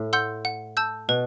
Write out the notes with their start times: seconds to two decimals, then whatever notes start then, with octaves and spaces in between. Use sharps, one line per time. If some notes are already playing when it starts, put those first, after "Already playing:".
Already playing: A2
0.13 F#5 C6 E6 G6
0.45 F#5
0.77 A5 E6 G6
1.09 B2 B4